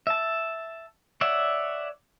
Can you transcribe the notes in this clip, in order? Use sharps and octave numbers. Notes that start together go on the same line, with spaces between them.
E5 A5
C#5 D5 E5 F#5